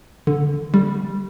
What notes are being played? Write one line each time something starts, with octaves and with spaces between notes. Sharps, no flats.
D3
G3